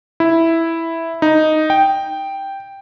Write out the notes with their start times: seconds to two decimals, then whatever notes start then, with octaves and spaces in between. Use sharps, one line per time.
0.20 E4
1.22 D#4
1.70 G5